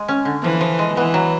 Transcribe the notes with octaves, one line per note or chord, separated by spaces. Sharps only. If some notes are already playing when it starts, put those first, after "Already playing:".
Already playing: G#3
C#4
D3
E3 F3
F3
G#3
E3 B3
F#3